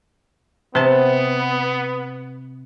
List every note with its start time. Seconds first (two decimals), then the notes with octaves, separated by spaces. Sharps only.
0.75 C3 B3 A5